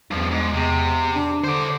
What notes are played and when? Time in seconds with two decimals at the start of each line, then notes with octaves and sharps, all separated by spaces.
0.11 E2 G2 F3
0.31 G#2
0.54 E2 C3
1.15 D4
1.44 D3 C5 D5